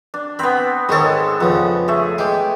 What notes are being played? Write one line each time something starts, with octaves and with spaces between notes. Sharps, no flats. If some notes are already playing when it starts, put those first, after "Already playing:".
D4
B3 C4 B5
G#2 D#3 G#3 A4 C#5
F2 C#3 B3
A3 G#4
G#3 G5 D6